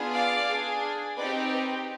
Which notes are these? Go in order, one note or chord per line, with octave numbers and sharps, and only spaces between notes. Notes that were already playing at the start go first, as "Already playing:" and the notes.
Already playing: B3 D4 F4 G#4
D5 F5
D4 G#4
C4 D#4 G4 B4 D5
B4